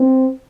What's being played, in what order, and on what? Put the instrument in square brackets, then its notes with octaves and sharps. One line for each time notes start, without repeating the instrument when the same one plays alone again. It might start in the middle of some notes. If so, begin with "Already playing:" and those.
Already playing: [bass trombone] C4